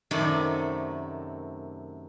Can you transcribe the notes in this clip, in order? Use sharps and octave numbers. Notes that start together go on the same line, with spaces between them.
F#2 C3 D#3 A3 D5